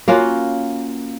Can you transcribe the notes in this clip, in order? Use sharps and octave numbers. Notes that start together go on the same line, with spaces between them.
A#3 C#4 F4 F#4